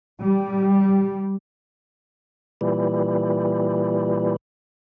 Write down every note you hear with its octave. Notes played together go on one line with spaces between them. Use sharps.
G3
A#2 E3 G3